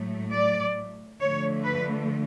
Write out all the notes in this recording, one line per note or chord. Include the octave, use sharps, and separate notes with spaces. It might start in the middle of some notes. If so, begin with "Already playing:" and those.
Already playing: A2 F#3 A3
D5
D3 F3 A3 C#5
B4